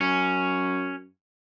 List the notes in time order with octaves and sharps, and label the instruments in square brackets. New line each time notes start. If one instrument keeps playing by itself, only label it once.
[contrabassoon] F#2 [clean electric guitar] C#4